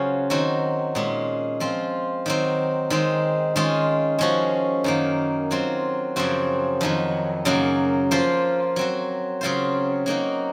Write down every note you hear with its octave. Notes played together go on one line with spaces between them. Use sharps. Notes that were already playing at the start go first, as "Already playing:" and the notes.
Already playing: C#3 F#3 C#4 F4 C5
D#3 F#3 C4 F#4
A#2 G#3 C#4
F3 C4 F4
D#3 F#3 C4
D#3 G#3 C4
D#3 G#3 C#4 F4
F3 G#3 C#4 F#4
F#2 D#3 A#3
F#3 C4 F4
F#2 C#3 F3 C4 F#4
F2 D#3 F#3
F#2 C#3 F#3 A#3
F3 A#3 F4 C5
F#3 C4 F#4
C#3 F#3 C4 F4 C5
F#3 A#3 D#4 F#4